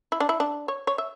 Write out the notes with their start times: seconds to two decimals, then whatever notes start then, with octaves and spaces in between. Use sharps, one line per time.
0.12 E4
0.20 D4
0.29 E4
0.40 D4
0.68 C#5
0.87 C#5
0.98 E5